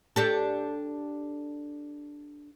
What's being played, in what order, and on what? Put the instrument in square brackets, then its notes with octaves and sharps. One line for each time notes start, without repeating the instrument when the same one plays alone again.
[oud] D4 G4 A4